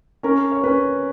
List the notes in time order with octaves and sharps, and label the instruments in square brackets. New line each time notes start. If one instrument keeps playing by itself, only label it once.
[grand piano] C#4 A#4
C#5
C#4 B4